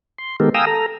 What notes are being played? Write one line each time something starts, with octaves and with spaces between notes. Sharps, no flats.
C6
D#3 G#3 B3 G4 A4 A#4
F5 G5 G#5 A#5 D#6 E6
A4 A#5